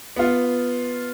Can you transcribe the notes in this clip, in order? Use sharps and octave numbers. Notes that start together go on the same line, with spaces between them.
B3 F4